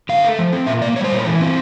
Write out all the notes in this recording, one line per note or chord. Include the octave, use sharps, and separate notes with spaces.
D3 F5
A3
F3
C4
A#2 E5
A#3 D5
G3 C#5
C5
A#2 C#5
E3
C4